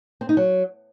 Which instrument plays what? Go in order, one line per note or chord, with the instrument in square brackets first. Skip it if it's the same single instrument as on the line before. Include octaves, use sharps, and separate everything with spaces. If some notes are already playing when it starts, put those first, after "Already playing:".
[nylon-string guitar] C4
D#4
F#3